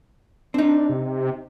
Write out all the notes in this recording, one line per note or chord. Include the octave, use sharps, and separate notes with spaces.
C4 D4 D#4
C3